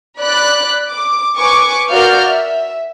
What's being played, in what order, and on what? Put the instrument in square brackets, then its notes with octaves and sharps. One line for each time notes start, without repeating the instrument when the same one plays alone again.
[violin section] D5 B5 F#6
D6
B4 G#5 C#6 D6
F#4 A#4 D5 F5 F6 G6
E5